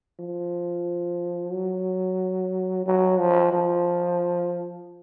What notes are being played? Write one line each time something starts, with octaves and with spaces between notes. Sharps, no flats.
F3
F#3
F#3
F3
F3